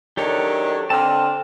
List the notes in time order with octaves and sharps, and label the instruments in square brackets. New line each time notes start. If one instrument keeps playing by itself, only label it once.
[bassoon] D#3 [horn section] F#3 C#4 D4 [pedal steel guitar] G4 A4 C#5
[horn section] D3 [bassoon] C4 [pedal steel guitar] A5 F6